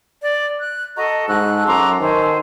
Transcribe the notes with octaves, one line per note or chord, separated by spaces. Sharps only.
D5
F#6
F#4 A4 D#5 A#5
G#2 F#4 A4 F#6
F#2 A#5 C6 D6
D#3 C5 G#5